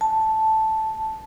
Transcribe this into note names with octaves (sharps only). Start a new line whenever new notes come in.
A5